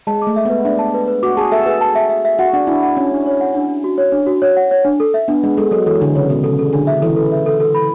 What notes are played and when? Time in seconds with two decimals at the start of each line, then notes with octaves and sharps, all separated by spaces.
0.07 G#3 A5
0.22 D6
0.27 A3
0.36 E5
0.45 B3
0.50 B4
0.65 D4 E5
0.79 A5
0.94 B4
1.08 B4
1.23 F#4 D6
1.37 G#4 A5
1.52 A4 E5
1.66 G#4 B4
1.81 A5
1.95 E5
2.09 E5
2.25 E5
2.39 F#4 F#5
2.53 D4 F#5
2.67 D4 E4
2.83 F#5
2.96 C#4 D4
3.11 D4
3.26 C#5
3.41 F#5
3.54 D4
3.68 D4
3.84 F#4
3.98 C#5
4.12 D4
4.26 F#4
4.42 C#5
4.57 F#5
4.71 C#5
4.85 D4
5.00 A4
5.14 E5
5.28 B3 D4
5.43 G#3 D4
5.57 G#3 A4
5.71 F#3 A4
5.86 E3 A4
6.01 D3 D4
6.15 C#3 C#5
6.29 B2 A4
6.44 C#3 A4
6.59 A4
6.73 D3 D4
6.87 E5
7.02 E3 A4
7.16 A4
7.32 E5
7.46 A4
7.60 A4
7.75 B5